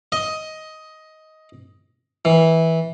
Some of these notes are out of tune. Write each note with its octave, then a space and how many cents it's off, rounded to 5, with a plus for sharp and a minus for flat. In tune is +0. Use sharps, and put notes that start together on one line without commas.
D#5 +15
E3 -15